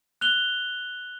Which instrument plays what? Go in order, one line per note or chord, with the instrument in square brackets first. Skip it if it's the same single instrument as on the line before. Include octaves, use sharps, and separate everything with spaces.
[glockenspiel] F#6 F7 G7